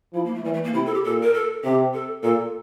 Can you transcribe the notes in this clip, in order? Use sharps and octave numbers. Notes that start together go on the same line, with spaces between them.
F3 E4
A#3
A3
E3 G3
A3
A#3
C3 E4
A4
G4
A#2 A4
A#4
A4
C3 G4
A4
A#2 A4